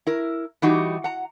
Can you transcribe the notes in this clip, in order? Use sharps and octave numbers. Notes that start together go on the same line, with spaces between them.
E4 A#4
E3 G3 D#4 F#4 G4
F#5 A#5